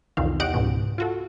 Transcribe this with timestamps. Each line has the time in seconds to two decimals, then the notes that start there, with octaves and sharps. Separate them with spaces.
0.17 C2 F2 D#3 E3 F5
0.40 E2 G4 D#5 F#5 D7
0.54 C#2 G#2 B2
0.98 F4 F#4 A4